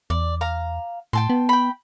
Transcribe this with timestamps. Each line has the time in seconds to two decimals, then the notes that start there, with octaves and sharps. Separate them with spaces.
0.10 E2 D5
0.41 F5 A#5
1.13 A2 G5 A5 C6
1.30 B3
1.49 G5 B5